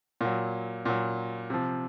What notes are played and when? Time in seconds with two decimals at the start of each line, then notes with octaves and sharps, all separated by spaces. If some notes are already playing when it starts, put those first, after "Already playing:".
0.21 A#2 F#3
0.86 A#2 F#3
1.50 C3 F3